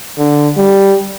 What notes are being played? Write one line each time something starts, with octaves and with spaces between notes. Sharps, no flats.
D3
G3